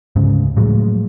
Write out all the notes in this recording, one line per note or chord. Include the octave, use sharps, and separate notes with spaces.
D2 G#2 C#3
A2 F3 F#3 G#3